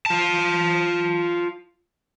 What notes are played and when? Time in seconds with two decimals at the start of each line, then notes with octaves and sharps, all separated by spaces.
0.06 F4 A5